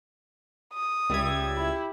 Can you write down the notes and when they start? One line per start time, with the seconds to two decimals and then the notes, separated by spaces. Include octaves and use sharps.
0.73 D#6
1.10 C#2 G3 E5 G#6
1.57 E4